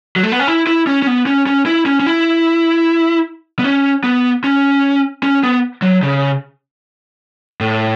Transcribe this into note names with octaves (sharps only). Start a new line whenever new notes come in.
F#3
A3
B3
C#4
E4
E4
C#4
C#4
B3
C#4
C#4
E4
C#4
C#4
E4
B3
C#4
B3
C#4
C#4
B3
F#3
C#3
A2